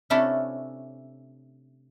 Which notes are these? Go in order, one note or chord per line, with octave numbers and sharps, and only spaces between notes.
C3 A3 C#4 D4 E4 A4